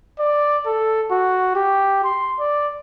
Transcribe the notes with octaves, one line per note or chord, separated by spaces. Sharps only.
D5
A4
F#4
G4
C6
D5